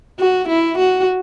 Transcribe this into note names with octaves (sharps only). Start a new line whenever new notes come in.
F#4
E4
F#4